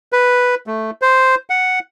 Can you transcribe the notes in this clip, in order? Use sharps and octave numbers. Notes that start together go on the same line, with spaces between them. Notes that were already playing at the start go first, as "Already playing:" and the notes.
B4
A3
C5
F#5